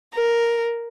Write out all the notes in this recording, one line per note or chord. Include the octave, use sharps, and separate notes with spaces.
A#4